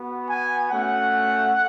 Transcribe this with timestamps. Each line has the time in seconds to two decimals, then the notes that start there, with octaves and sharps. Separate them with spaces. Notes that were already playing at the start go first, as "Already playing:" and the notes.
Already playing: B3 F#4
0.28 G#5
0.70 A3 C#4 F#4 F#5